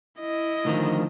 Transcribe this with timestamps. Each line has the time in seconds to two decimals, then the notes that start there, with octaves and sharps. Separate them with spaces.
0.20 E4 D#5
0.65 D2 D#3 F3